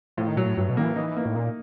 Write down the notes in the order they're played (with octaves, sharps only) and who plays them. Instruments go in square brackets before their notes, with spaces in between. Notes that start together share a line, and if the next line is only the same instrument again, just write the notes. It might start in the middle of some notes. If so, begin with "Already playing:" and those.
[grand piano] A2 [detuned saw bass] F3
[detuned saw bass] D#3
[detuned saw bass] A#2 [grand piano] F#3
[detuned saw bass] A2
[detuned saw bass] G2 [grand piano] F#3
[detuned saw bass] B2
[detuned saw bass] D#3 [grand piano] A#3
[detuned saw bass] E3
[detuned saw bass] E3 [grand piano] D#4
[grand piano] A#3
[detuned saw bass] A2
[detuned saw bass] A#2 [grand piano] A#3